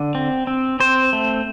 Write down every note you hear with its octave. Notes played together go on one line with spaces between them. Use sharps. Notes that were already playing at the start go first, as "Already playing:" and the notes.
Already playing: D3
C4
C4
C4 C5
A3